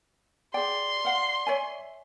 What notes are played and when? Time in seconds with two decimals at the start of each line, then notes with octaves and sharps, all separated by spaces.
0.54 G#4 D5 G5 C6
1.05 F5 F#5
1.47 C#5 E5 G#5